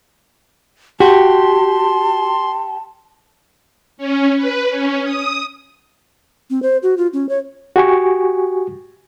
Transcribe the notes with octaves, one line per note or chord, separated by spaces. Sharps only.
F#4 G4 A5 C6
C#4
B4
C#4
D#6
C4
C5
F#4
F4
C#4
C#5
F#4 G4 G#5 C#6